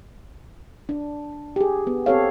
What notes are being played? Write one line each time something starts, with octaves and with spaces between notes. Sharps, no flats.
D4
G4 G#4
B3
C4 G4 A4 C#5 F5